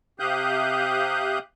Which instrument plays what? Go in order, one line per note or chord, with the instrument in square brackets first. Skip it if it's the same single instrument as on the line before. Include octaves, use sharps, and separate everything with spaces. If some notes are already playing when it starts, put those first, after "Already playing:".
[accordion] C3 G4 F5 D#6 F#6 G6